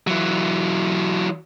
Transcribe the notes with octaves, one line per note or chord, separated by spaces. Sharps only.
E3 F#3